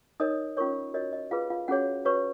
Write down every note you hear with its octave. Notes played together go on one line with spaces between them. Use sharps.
D#4 A#4 C#5 D#5 D#6
C#4 F4 A#4 C#5 C#6
F#4 A#4 C#5 D#5
D#5
F4 G#4 B4 F5
F4 F5
C#4 F#4 G#4 C#5 F#5
F#4 B4 C#5 C#6